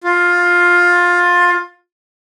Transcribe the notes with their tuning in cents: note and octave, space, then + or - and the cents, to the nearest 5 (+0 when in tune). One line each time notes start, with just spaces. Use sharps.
F4 +15